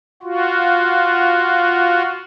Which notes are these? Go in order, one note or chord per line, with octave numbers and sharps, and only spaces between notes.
F4 F#4